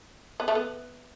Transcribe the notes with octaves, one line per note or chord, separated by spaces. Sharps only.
B3
A3
B3